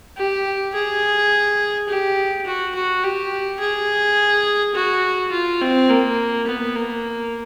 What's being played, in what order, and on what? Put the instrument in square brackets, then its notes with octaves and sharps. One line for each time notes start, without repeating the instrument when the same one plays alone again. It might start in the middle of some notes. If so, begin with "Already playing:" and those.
[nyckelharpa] G4
G#4
G4
F#4
F#4
G4
G#4
F#4
F4
C4
A#3
B3
A#3